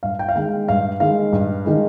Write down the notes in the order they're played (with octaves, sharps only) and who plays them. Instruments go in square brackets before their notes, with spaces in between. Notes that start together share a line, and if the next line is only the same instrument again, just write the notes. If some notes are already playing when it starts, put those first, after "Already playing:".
[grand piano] G2 F5
G5
F5
D#3 G#3 G5
G2 F5
D#3 G#3 F5
G2
D#3 G#3